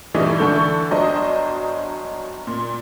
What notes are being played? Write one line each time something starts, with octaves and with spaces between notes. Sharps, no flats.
G2 E3 G3 A3 D#4
D3 E3 A4 C#6 G6
G1 F#3 D4 C5 D#5 D#6
A#2